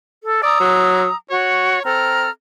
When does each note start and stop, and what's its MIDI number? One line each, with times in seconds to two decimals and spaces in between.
0.23 0.41 69
0.43 0.57 74
0.43 1.16 82
0.43 1.16 87
0.43 1.16 88
0.60 1.07 54
1.30 1.80 66
1.30 1.82 73
1.85 2.27 60
1.85 2.30 69
1.85 2.30 82
1.85 2.30 89